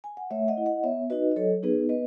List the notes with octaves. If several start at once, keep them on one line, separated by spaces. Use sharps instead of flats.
G#5
F#5
A3 C#5 E5
D#5 F#5
E4
D#5 F#5
B3 C#5 E5
D#4 F#4 B4 D#5
D#5
F#3 A4 C#5
B3 D#4 G#4 B4
B3 B4 D#5